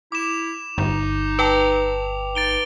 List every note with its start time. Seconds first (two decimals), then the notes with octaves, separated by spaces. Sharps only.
0.12 E4 D6 E7
0.78 G1 D#4
1.39 B4 G5 A5 D6 F7
2.35 D#4 A6 D7 G7